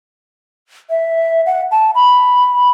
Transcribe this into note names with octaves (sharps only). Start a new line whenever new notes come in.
E5
F#5
A5
B5